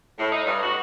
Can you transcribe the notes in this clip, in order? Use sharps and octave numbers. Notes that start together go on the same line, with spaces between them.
A2
D#4
G2
F#4